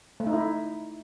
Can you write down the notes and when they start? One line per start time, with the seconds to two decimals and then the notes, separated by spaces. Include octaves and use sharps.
0.20 A3
0.27 D#4
0.33 E4